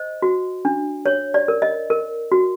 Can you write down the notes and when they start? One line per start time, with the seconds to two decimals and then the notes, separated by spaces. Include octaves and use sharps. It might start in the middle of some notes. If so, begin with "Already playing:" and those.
Already playing: C5 D#5
0.22 F#4
0.65 D4
1.06 C#5
1.34 D5
1.48 A#4
1.62 D#5
1.90 A#4
2.32 F#4